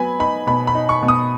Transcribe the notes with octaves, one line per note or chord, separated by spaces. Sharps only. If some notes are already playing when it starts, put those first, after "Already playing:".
Already playing: F#3 B3 G#5 B5
D#4 B5
B2 B5
B5
D#4
C#6
B2
D#6